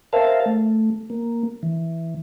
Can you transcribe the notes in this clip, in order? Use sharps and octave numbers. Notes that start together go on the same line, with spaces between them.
A#4 C5 E5 F5 A5
A3
A#3
E3